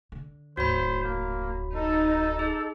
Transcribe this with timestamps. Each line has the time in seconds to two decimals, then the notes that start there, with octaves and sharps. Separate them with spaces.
0.12 D3
0.57 D1 G#1 F#4 C5 C#5 B5
1.04 A#3
1.76 D#4 A4
2.39 G#4